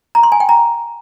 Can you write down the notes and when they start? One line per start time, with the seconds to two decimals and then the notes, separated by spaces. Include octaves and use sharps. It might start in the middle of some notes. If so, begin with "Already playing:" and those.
0.15 A#5
0.23 C6
0.32 G#5
0.40 G5
0.49 A#5